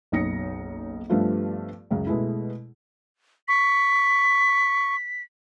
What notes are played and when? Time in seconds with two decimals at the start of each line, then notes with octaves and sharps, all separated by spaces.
0.12 F#1 B1 D#4 D#6 A#6 C#7
1.10 G2 F3 G3 A3 B3 F4
1.90 C#2 F#2 C#3
2.07 B2 G#3 A3 E4
3.48 C#6 B6